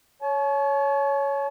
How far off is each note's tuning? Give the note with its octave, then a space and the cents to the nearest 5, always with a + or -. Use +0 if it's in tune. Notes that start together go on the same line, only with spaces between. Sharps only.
C#5 +5 A5 -45